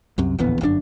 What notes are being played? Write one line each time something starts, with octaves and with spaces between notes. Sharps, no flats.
C2 F#2 C3
D1 A#1 E2 B3
G1 F#2 D#3 D4